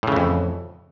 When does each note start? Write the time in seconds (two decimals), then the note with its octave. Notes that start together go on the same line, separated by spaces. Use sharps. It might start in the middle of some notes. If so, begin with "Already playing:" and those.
0.03 A2
0.07 C#3
0.12 E3
0.16 F2